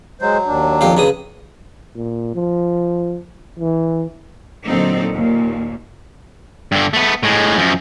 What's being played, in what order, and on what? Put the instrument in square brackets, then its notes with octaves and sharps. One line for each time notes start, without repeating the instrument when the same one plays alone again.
[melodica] F#3 [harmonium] G#3 C5
[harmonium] D#2 D4
[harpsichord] F2 G4 F5
C#3 B4 D#6
[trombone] A#2
F3
E3
[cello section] A#2 D3 F#3 C4 D#4 A4
D#2 A#2
[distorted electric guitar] G2 D3
A3 B3
A2 G#3
F#2 F3